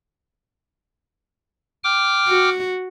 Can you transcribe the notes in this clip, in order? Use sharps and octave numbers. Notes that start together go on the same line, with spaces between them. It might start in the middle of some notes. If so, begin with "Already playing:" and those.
G5 D6 F6
F#4